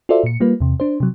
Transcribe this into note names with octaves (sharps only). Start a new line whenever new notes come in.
F4 F#4 A4 C5 D5 E5
A#2 C#7
G3 A#3 F4 B4
E2 C3
D4 C5
C3 F#3